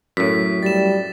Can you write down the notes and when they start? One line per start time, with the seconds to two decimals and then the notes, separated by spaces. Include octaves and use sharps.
0.17 F#2 A2 B6
0.63 G3 A6 E7